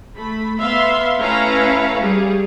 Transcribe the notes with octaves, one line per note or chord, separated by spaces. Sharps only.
A3 B5
B3 E5 F5 C6
A3 C#4 E4 B4 F5 A#5
G3 G#4